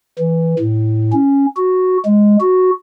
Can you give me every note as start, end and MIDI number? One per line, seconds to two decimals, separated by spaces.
0.19 0.55 52
0.59 1.12 45
1.13 1.46 61
1.57 1.98 66
2.05 2.37 56
2.41 2.71 66